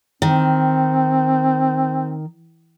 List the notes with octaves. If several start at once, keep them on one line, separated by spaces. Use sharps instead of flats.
D#3 C4